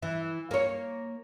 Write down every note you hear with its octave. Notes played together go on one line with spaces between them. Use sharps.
E3
A#3 C#5